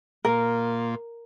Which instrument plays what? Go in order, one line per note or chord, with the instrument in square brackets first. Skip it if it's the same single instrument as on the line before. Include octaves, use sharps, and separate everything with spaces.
[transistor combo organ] A#2 A#3 F4 [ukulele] A#4